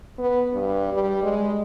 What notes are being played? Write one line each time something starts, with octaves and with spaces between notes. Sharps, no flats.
B3
G2
G3
G#3